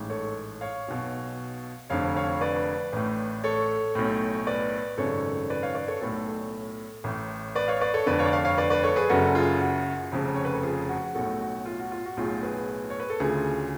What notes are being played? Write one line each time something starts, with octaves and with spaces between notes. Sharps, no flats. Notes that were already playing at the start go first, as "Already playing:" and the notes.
Already playing: A1 G#2
A4 C#5
C#5 F5
B1 B2
F1 F2 D3 C#5 F5
C#5 F5
B4 D5
A1 A2
A4 C#5
B1 A2
B4 D5
G#1 F#2 C#3 A4 C#5
B4 D5
C#5 F5
B4 D5
A4 C#5
B1 A2 A4 C#5
A1 A2
B4 D5
C#5 F5
B4 D5
A4 C#5
F1 F2 D3 B4 D5
C#5 F5
D5
C#5 F5
C#5 F5
B4 D5
B4 D5
A4 C#5
G#4 B4
F#1 F#2 C#3 F#4 A4
F4 G#4
F#4
F1 F2 C#3
C#5
B4
A4
F4 G#4
F#4
B1 A2 F#4 A4
F#4
F4
F#4
F4
F#4
B1 A2 F4 G#4
G#4 B4
C#5
B4
A4
D2 C#3 F4 G#4